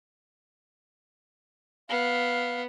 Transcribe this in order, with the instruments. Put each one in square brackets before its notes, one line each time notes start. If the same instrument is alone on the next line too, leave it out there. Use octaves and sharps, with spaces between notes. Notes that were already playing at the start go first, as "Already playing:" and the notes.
[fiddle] B3 [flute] F5